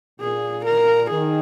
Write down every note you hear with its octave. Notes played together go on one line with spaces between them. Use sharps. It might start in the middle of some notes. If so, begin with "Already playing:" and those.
A#2 G#4
A#4
D#3 G#4